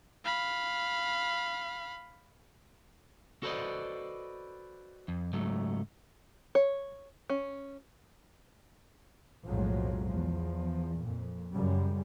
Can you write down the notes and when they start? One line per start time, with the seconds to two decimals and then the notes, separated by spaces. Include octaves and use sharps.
0.24 F5 B5
3.43 F#4 A4 B4 C5 D5 D#5
5.08 F2
5.33 C#2 G#2 F#3 A3
6.55 C#5
7.30 C#4
9.46 B1 F2 A2 F3 F#3 G#3
10.09 E2 F3
11.01 F2 A#2
11.53 F#2 C#3 G3 G#3